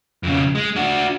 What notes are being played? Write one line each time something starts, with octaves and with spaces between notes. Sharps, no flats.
F2 C#3
G#3
D4 F#4